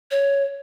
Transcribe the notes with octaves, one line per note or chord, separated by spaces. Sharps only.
C#5